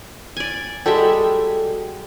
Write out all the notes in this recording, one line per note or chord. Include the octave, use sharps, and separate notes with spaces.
D5 G#5
G3 G#3 F#4 A4 E5 G5